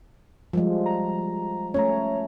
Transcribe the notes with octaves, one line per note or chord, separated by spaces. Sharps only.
F3 G3 G#3
A#5
A3 C#4 C#5 A#5